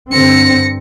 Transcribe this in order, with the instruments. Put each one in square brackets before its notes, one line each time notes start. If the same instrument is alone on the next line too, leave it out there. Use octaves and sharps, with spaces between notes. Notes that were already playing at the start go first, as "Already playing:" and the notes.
[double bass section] G2 D3 C4 [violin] A#6 C#7